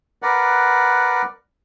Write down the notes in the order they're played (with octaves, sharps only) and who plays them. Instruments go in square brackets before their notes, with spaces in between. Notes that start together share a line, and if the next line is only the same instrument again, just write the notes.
[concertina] A#4 B4 D5 F#5